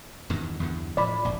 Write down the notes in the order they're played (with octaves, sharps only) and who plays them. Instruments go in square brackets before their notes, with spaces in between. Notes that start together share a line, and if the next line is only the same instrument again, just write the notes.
[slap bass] E2 G2 D#3
E2 G2 D3
[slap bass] A2 F3 [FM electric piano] D5 B5
[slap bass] F1 A#1